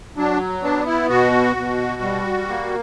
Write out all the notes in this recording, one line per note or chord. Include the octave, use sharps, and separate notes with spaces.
F#3 D4
B3 D4
E4
B2 F#4
B2
G3
A#3